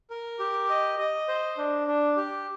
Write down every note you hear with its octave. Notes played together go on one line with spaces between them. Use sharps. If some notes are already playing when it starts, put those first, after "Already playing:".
A#4
G4
D#5
D#5
C5
D4
D4
G4